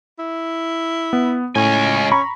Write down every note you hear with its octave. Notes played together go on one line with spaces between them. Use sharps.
E4
B3
C#2 A2 C#4 G#5
A#5 B5 C#6